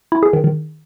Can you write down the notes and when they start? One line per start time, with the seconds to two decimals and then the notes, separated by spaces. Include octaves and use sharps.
0.12 E4
0.23 G#4
0.33 D#3
0.44 D#3